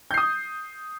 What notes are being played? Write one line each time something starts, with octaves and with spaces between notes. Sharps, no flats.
D#6 G6 C7